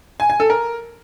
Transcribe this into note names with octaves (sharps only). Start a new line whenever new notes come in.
G#5
G#5
A4
A#4